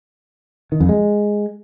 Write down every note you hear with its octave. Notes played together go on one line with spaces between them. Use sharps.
D#3
F2
G#3